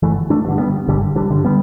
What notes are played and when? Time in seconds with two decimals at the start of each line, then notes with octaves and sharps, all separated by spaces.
0.02 G1 E3 A3
0.30 A3 D4
0.45 G2 D3
0.59 G3 B3
0.88 G1 D3 G3
1.16 D3 G3
1.30 G2 D3
1.45 G3 B3